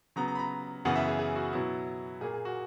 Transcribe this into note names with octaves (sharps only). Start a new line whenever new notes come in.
C#3 F#3 B3 A#5
A#5
B5
A#5
F#2 C#3 E3 B3 F#5
E5
G#4
G#4
F#4
B2 F#3 B3 E4
A#2 A#3 G#4
G#4
F#4